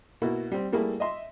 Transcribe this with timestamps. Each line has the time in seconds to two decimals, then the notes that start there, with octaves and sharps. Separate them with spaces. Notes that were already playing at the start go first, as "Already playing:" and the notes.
0.22 B2 A#3 E4 F#4
0.52 G3 C4
0.72 G3 A3 A#3 E4 G#4
1.00 D#5 E5 C6